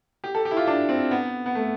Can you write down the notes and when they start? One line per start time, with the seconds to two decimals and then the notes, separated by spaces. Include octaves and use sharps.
0.24 G4
0.35 A4
0.45 G4
0.51 E4
0.57 F4
0.67 D4
0.89 C4
1.11 B3
1.46 B3
1.55 A3